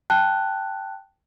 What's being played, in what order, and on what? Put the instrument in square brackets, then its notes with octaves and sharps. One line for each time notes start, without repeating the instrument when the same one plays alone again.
[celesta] G5 A5 F#6